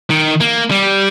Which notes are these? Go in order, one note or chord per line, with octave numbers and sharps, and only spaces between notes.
D#3
A#3
G3